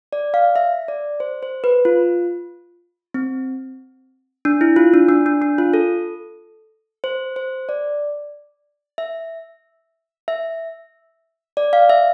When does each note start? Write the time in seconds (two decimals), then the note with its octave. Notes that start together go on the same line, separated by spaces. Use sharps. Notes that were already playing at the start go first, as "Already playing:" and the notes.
0.13 D5
0.34 F5
0.56 E5
0.88 D5
1.20 C5
1.43 C5
1.64 B4
1.85 F4
3.14 C4
4.45 D4
4.61 E4
4.76 F4
4.94 D4
5.09 D4
5.26 D4
5.42 D4
5.58 F4
5.74 A4
7.04 C5
7.36 C5
7.69 D5
8.98 E5
10.28 E5
11.57 D5
11.73 F5
11.90 E5